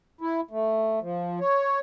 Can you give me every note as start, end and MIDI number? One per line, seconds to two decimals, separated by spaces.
0.21 0.40 64
0.51 0.99 57
1.02 1.39 53
1.40 1.80 73